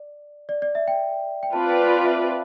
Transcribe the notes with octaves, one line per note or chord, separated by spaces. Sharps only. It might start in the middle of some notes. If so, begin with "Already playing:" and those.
Already playing: D5
D5
D5
E5
G5
G5
C4 F4 B4 D5 A5
G5
F5
E5